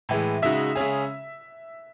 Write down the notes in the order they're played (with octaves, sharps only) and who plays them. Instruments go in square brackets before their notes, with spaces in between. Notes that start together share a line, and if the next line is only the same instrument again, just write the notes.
[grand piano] A2 E3 G#3
[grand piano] C#3 G#3 D#4 F#4 [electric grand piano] E5
[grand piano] C#3 G#3 C#4 G#4